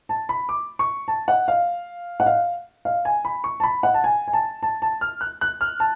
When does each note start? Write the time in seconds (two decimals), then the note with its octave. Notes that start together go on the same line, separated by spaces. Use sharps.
0.09 A5
0.29 B5
0.49 D6
0.79 C#6
1.08 A5
1.28 F#5
1.48 F5
2.20 F#5
2.26 F5
2.85 F5
3.05 G#5
3.25 B5
3.44 C#6
3.60 A5
3.63 B5
3.83 F#5
3.94 A5
4.04 G#5
4.28 G#5
4.33 A5
4.63 A5
4.82 A5
5.01 F6
5.21 F#6
5.41 F#6
5.61 F6
5.80 A5